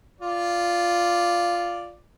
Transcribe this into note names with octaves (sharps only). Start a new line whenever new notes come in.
F4 D5